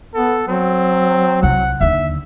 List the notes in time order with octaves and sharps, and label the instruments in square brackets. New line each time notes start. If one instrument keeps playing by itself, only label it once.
[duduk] B3 [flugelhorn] A4
[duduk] F#3 [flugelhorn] C4
[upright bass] C2 F4 [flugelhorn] F#5
[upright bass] D#2 D3 [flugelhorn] E5